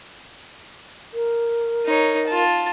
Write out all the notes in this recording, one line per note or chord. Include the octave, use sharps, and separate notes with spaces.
A#4
D#4 C#5
F4 A5